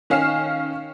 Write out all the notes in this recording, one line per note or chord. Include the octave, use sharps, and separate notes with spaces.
D#3 C#4 F5 F6 C7 E7